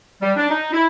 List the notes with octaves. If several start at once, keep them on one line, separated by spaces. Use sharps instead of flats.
G3
D4
D#4
E4